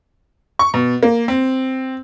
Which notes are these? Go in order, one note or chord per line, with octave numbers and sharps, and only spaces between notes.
C#6
B2
A#3
C4